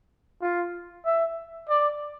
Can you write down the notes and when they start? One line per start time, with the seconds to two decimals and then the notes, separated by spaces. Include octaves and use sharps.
0.42 F4
1.05 E5
1.69 D5